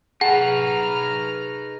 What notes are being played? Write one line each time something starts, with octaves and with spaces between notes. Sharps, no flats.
D#4 G#4 B4 F#5 A5 A#5 F6